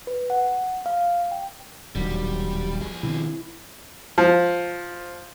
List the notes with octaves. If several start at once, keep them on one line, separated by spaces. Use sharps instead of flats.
B4
F#5
F5
G5
D1 A#1 D#2 F#3 G3
F3 G#4
B2 D#3 C4 E4
F3